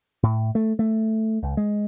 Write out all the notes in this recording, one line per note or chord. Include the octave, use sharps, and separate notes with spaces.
A2
A3
A3
C#2
G#3